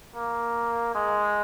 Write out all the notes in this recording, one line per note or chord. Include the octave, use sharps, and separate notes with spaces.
A#3
G#3